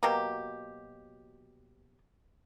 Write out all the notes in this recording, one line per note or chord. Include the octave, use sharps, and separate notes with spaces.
B2 F#3 A#3 G4